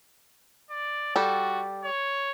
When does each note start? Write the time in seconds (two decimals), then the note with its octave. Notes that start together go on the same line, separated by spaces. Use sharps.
0.70 D5
1.16 G3 F#4 A4
1.84 C#5